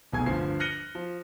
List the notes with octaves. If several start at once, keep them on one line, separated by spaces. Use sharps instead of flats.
F1 B1 B2 G#4 G#5 G#6
D2 G2 F3 C7
F6 F#6 A#6 C#7 D#7 G7
F3